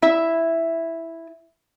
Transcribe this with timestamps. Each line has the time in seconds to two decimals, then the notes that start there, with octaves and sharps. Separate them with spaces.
0.02 E4 E5